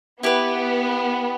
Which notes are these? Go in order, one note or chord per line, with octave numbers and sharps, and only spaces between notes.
B3 E4 G4 B4